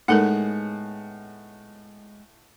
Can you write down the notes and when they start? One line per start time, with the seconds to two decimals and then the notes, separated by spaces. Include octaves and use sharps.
0.08 A2 G#3 B3 D#4 A4 A#4 C#5 F#5